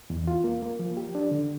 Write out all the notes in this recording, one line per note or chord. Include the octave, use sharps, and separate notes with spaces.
E2
F4
A#3
A#3
F3
G4
D4
D3